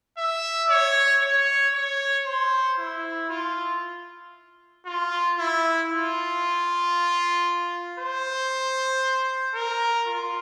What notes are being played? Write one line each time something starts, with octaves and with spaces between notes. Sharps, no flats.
E5
C#5
C#5
C#5
C5
E4
F4
F4
E4
F4
C5
A#4
F4